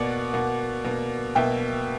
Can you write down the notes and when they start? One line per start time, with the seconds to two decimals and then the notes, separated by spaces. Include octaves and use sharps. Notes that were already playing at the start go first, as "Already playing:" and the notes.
Already playing: B2 A#3 D5 F#5
0.33 B2 A#3
0.84 B2 A#3
1.35 B2 A#3 E5 G5